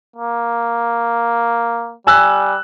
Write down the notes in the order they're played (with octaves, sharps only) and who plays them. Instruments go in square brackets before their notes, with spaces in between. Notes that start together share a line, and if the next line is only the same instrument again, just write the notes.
[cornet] A#3
[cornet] G3 [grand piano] G#5 E6 F#6